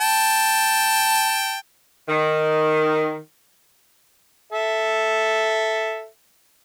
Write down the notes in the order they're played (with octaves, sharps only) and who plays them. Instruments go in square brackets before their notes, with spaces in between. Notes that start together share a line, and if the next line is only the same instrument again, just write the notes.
[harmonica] G5 A5
[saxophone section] D#3
[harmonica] A4 E5